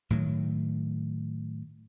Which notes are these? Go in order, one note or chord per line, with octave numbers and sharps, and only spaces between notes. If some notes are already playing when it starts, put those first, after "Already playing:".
A2 D#3 F#3